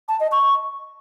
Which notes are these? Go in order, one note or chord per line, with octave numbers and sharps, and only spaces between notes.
A5
D#5
C#6